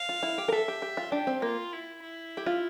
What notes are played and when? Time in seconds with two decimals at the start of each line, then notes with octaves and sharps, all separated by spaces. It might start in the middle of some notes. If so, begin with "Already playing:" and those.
Already playing: F5
0.09 F4
0.23 E4
0.38 G4
0.48 A#4
0.52 A4 E5
0.68 G4
0.82 G4
0.97 F4
1.12 D4 G4
1.27 C4
1.42 A#3 F4
1.72 E4
2.02 E4
2.37 G4
2.46 F4